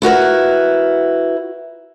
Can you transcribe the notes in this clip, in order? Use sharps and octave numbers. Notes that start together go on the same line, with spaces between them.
E4 F#4 A#4 B4